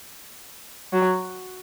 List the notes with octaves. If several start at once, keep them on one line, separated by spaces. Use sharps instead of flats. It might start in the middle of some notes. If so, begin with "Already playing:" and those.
F#3